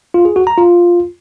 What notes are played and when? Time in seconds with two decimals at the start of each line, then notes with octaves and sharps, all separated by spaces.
0.14 F4
0.25 G#4
0.36 F#4
0.47 A#5
0.58 F4